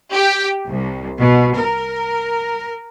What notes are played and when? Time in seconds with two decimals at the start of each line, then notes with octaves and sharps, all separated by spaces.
0.13 G4
0.66 C2
1.18 B2
1.56 A#4